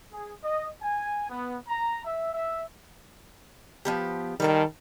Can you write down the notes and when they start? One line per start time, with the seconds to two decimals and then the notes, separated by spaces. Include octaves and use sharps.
0.12 G#4
0.44 D#5
0.83 G#5
1.30 B3
1.68 A#5
2.05 E5
2.34 E5
3.85 F3 B3 G4
4.40 D#3 G3 A4 A#4